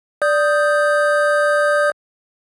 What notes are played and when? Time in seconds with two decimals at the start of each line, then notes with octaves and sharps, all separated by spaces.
0.22 D5 D#6 G6